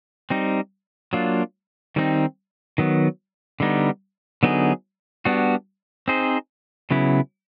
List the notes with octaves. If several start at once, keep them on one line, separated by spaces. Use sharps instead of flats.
G3 C4 D#4
F#3 A#3 D4 F4
D#3 G3 C4 D#4
D#3 F#3 B3
D3 G3 B3 D#4
D3 F#3 B3 D#4 G#4
G3 B3 D4 F#4
C4 D#4 G#4 C5
C#3 F#3 B3 E4